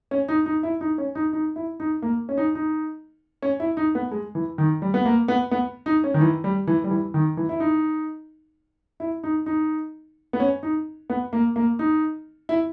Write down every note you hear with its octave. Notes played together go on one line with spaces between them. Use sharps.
C#4
D#4
D#4
E4
D#4
C#4
D#4
D#4
E4
D#4
A#3
C#4
D#4
D#4
C#4
E4
D#4
B3
G#3
E3
D#3
G3
B3
A#3
B3
B3
D#4
C#4
D#3
E3
G3
E3
G3
E3
D#3
E3
E4
D#4
E4
D#4
D#4
B3
C#4
D#4
B3
A#3
A#3
D#4
E4